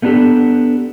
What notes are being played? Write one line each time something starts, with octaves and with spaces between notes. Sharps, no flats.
A3 B3 C#4 D4 G4 A4